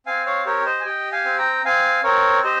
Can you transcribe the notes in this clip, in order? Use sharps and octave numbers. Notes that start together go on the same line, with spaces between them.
C4 F5 G#5
C#5 F5
G4 A#4 C#5
C5 D#5
G#5
G4 D#5 G5
F5 G#5
C4
G5 A#5
C4 F5 G#5
C4 A#4 C#5
G4 C5 D#5